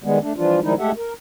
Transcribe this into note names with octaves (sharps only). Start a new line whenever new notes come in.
D#3 G3 G#3 B3
A3 D4
E3 F3 G3 D4 F4
D#3 F3 G3 G#3 D#4 E4
G#3 A3 G4 A4 E5 F#5
A#4